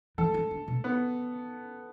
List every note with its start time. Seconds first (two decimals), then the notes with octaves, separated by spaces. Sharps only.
0.18 E3 A4
0.34 E3
0.51 D3
0.68 B2
0.84 B3